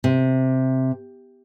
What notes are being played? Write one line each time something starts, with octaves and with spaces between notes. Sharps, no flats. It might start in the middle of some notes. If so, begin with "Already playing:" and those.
C3